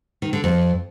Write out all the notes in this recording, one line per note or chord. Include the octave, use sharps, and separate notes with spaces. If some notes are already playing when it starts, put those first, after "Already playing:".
D#3
D3
F2